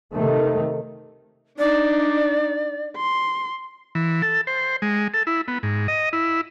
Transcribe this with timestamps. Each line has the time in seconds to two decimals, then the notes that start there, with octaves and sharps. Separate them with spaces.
0.13 C3 D#3 A3
1.58 D4 D#4 D5
2.97 C6
3.95 E3
4.22 A4
4.47 C5
4.82 G#3
5.14 A4
5.27 E4
5.48 B3
5.63 G#2
5.88 D#5
6.13 E4